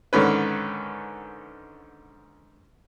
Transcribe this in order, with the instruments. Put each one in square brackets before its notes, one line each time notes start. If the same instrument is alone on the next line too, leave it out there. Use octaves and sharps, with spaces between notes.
[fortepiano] G#2 D3 D#3 C#4 B4